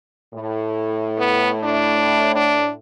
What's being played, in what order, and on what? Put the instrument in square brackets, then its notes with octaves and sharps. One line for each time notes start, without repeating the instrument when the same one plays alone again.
[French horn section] A2
[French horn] B3
D4
D4